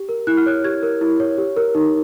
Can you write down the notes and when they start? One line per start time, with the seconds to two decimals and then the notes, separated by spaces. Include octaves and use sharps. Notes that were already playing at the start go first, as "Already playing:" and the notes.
Already playing: G4
0.09 A#4
0.27 E4 F#6
0.37 F6
0.46 C#5 F#6
0.64 G4 G#6
0.83 A#4
1.01 E4
1.20 C#5
1.38 G4
1.57 A#4
1.75 D#4